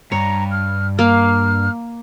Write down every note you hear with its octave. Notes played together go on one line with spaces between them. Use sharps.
G2 C#5 A#5
F6
A#3 F5 F6